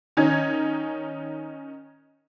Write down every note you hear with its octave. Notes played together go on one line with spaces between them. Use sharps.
D#3 C#4 D#4 G#6